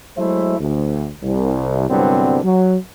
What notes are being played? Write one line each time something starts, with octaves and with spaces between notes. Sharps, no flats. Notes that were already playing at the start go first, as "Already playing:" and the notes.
F#3 G#3 A3 E4 C5 E5
D2
C2
C2 G2 D3 F#3 B3 C4
F#3